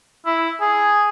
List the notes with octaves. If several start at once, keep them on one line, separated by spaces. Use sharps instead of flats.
E4
G#4